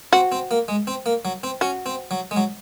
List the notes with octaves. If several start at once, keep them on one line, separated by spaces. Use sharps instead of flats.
C4 F#4
C4
A#3
G#3
C4
A#3
F#3
C4
C#4 F#4
C4
F#3
G#3
F#3